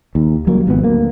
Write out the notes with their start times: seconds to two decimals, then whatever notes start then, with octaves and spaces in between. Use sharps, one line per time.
0.15 D#2
0.47 C#2 F#3 G3 A#3
0.67 G#1 F2 B3
0.83 D2 A#3